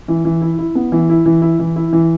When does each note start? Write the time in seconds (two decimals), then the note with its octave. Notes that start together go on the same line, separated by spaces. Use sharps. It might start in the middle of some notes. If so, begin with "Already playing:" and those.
0.08 E3
0.25 E3
0.42 E4
0.59 E4
0.75 B3
0.92 E3
1.09 E4
1.26 E3
1.42 E4
1.59 E3
1.76 E4
1.93 E3